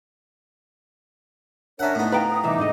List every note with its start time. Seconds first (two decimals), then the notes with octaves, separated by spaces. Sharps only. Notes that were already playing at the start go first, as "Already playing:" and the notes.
1.79 C#4 D4 A#4 C#5 E5 F#5
1.95 A2 B3 D#4
2.12 B4 F5 G5 A#5
2.30 D#6
2.44 C2 E3 D#4 E5 D6
2.58 G#2 D3 D#5